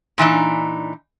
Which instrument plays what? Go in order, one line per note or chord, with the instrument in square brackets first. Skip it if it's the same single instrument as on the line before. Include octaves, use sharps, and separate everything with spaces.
[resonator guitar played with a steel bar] A#2 E3 D4 D#4